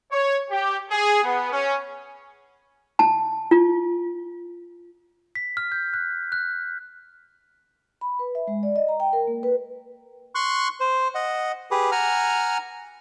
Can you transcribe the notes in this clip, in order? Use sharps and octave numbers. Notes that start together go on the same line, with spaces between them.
C#5
G4
G#4
B3
C#4
A5
F4
B6
F6
G6
F#6
F#6
B5
B4
E5
G#3
D5
D#5
A#5
G5
A#4
A#3
B4
C6 C#6 F#6
C5
D#5 F#5
G4 G#4 B4
F#5 G#5 A#5 F6